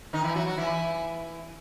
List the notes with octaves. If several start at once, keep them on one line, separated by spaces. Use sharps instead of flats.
D#3 D#4
E3 E4
F#3 F#4
F#3 F#4
E3 E4